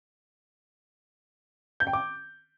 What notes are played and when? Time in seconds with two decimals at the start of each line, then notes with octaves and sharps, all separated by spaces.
1.80 G6
1.87 G5
1.93 D6